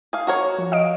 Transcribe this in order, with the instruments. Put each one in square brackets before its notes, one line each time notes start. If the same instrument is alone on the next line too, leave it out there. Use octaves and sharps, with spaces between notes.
[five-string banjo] G#4 F5
F#4 A#4 C#5
[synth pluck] F3
D#5 F5 D7